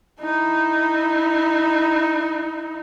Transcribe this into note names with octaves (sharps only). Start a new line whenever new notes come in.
D#4 E4